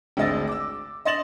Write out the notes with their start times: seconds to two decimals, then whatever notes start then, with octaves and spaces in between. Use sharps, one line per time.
0.17 G#1 D2 G#3 D#5 E6 A6
0.48 D6 E6
1.05 D#5 C6 A6 E7 F#7